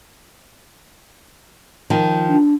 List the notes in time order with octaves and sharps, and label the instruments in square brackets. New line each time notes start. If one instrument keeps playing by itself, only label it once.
[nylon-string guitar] D#3 F3
[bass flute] D4